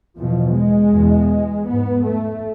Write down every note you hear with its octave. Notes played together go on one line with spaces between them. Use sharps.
E2 B2 F3
G#3
E2 B2
G#2 B3
A3